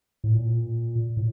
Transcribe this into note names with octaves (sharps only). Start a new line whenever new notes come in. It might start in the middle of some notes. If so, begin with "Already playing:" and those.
A2
A#2
A2